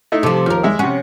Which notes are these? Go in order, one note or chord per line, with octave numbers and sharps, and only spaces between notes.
A3 D#4 E4
C3 F3 A4
D#2 F3 A#4
G#3 E5
C3 C#4 F#5